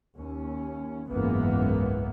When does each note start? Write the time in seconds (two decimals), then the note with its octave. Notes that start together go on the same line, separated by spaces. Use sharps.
0.15 D#2 C#4
1.09 F#1 C#2 G#2 E3 A#3 B3